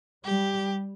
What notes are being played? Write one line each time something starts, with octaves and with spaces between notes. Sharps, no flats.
G3 G4